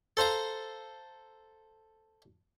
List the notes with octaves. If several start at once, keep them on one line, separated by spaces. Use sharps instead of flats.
A4 C5 F5 A#5